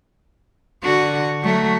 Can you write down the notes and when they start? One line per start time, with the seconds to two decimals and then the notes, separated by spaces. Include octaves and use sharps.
0.83 D3 F#4
1.43 F#3 A3